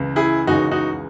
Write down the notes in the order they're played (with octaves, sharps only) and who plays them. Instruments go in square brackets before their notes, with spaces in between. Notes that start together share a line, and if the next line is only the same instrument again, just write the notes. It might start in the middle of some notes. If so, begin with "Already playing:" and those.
Already playing: [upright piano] C#2 C#3 E3
[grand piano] E4 G#4
[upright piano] C#2 C#3 E3 G#3 C#4 [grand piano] D#4 F#4
[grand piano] D#4 F#4